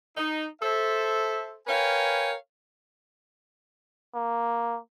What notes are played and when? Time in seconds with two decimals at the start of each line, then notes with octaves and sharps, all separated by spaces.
0.17 D#4
0.62 A4 C5 E5
1.67 A#4 B4 C#5 F5 G5 G#5
4.15 A#3